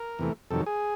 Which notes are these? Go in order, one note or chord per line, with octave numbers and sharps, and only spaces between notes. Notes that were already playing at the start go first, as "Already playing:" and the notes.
Already playing: A#4
E2 C3 E3 A3
F2 C3 D#3 F#3 A4
G#4